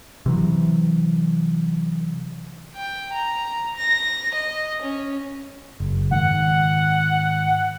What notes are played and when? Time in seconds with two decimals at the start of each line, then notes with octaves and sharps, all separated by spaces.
0.26 C3 E3 F#3
2.76 G5
3.13 A#5
3.77 A#6
4.35 D#5
4.82 C#4
5.80 F#1
6.11 G#2 D#3 F#5